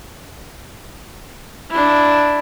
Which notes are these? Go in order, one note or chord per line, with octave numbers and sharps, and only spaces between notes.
D4 E4